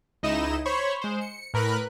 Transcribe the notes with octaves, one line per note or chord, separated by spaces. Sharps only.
C#2 D#4 E4 D#5 E7
C5 C#5 B5 C#6
G#3 C5
C#7
A2 A#4 B4 B5 F#6